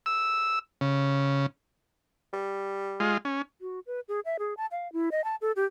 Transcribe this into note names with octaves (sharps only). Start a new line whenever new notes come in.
E6
C#3
G3
G#3 F4
C#4
F#4
B4
G#4
E5
G#4
A5
F5
E4
D#5
A5
A4
G4